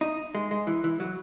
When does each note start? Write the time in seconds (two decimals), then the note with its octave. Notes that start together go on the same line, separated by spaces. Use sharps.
0.01 D#4
0.35 G#3
0.51 G#3
0.67 E3
0.84 E3
1.00 F#3